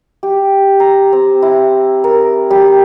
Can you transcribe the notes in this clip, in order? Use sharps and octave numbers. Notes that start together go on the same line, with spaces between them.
G4
A#5
C4
E4
A#4
G3